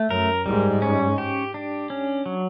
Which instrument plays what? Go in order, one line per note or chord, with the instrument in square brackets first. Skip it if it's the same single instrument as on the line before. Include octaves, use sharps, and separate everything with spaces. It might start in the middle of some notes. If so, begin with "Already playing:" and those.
Already playing: [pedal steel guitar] A3
[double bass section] F#2 [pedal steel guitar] A#4
[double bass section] G#2 [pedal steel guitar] G3
[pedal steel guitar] C#4
G4
D4
C#4
F#3